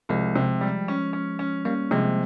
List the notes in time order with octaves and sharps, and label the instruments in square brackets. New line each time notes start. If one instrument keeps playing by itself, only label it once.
[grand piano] C2 [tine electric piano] F3 G#3
[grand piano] C3
G3
C#4
C#4
C#4
[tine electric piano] G3 A#3 [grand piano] C#4
[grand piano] C3 [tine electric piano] F3 G#3